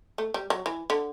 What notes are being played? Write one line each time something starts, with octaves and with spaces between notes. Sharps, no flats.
A3
G3
F#3
E3
D3